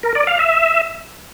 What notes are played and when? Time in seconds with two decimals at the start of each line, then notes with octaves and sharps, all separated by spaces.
0.03 A#4
0.15 D5
0.27 F5
0.39 E5